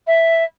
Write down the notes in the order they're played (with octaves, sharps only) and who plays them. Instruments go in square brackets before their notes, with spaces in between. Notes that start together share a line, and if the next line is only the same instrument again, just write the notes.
[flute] E5